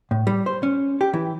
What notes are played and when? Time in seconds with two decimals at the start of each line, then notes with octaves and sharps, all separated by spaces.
0.11 A2
0.27 G3
0.46 C5
0.63 C#4
1.01 G4
1.13 E3